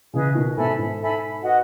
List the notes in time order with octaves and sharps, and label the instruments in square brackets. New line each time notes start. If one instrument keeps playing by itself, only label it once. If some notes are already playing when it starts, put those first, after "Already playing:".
[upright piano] C#3 E3 [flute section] G#4 B4 D#5
[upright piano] B2 D#3
[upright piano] G#2 B2 [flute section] A4 E5 G#5 B5
[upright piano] G#2
[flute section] A4 E5 G#5 B5
F#4 B4 D#5 F#5